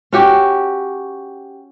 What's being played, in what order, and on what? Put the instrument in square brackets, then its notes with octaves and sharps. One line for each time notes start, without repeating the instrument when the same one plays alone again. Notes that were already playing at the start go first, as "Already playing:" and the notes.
[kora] C#4 F#4 G4